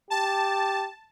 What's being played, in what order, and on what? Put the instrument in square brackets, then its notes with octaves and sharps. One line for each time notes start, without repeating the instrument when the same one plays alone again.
[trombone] G4 [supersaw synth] A5